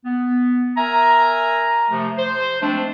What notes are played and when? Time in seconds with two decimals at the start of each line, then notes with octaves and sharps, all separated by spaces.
0.05 B3
0.77 A#4 E5 G#5 A#5
1.90 C3 F3 A3
2.18 C5
2.62 F3 G#3 A3 C4 D4